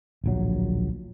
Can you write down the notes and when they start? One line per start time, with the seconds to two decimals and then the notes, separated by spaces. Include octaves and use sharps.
0.24 D1 A#1 F#3